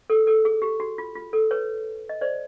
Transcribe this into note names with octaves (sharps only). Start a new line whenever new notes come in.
A4
A4
G#4
G4
F#4
F4
F4
A4
B4 C#5
D#5
C5 D5